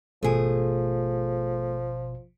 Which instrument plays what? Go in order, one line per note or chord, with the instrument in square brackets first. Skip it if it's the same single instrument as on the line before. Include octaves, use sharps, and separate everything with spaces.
[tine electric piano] G#1 B2 F4 [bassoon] F3 [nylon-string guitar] A3 G#4